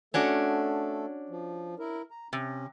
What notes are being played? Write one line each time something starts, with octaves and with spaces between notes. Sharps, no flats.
A3 C#4 D4 F#4 A4
F3
E4 A#4
A#5
C3 C#4